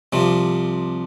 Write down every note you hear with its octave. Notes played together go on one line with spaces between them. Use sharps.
C2 C3 F3